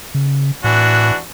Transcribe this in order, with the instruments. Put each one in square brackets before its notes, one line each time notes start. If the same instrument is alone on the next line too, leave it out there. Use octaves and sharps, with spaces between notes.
[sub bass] C#3
[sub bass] A2 [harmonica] E3 D4 F#4